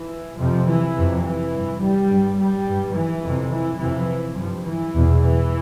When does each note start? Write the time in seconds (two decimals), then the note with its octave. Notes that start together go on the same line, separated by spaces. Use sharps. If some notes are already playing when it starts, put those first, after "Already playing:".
Already playing: E3
0.38 F2 C3 F3
0.67 E3
0.96 F2 C3
1.23 E3
1.52 G2
1.81 G3
2.08 G2
2.37 G3
2.66 G2
2.95 E3
3.22 F2
3.27 C3
3.51 E3
3.79 F2 C3 E3
4.36 G2 F3
4.65 E3
4.94 E2 B2
5.21 E3